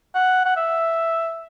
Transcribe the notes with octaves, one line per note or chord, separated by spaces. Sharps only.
F#5
F#5
E5